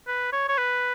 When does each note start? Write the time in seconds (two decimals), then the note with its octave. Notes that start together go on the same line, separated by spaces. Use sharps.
0.07 B4
0.32 C#5
0.49 C#5
0.58 B4